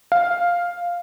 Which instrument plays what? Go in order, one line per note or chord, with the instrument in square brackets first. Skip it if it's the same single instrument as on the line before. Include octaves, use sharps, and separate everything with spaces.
[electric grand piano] F5